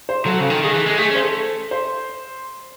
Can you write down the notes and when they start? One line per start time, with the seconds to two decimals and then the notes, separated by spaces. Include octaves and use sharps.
0.09 C5
0.25 F#3 A4
0.40 C#3
0.50 D#3
0.63 D#3 G#4
0.74 E3 A4
0.86 G#3
0.98 A3 G#4
1.10 C#4
1.15 C5
1.22 A4
1.71 C5